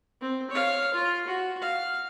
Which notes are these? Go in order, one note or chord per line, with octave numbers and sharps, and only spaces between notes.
C4
C#5 F5
F4
F#4
F5